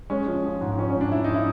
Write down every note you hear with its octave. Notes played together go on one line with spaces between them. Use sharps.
G#3 C#4
F3
F3
G#2
F3 C#4
C#4
G#2
D4
G#2 E4
D#4
F3
E4